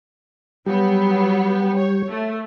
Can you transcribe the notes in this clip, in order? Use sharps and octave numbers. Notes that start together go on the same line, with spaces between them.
F#3 G3 B3 G4
C#5
A3